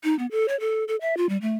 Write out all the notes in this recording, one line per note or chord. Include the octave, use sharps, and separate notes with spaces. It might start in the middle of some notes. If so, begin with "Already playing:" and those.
D#4
B3
A4
C#5
A4
A4
E5
F4
G3
A3